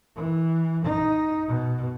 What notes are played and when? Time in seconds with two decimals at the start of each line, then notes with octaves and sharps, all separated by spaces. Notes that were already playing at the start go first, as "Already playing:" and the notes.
0.16 E3
0.86 D#4
1.47 B2